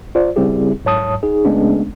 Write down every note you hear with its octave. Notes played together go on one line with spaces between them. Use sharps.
F4 C5 D5
C#3 G3 C4 E4 G4 G#4
G#2 F#3 C#5 A5 D#6
D#4 G#4
C#3 G#3 A3 B3 C#4 D4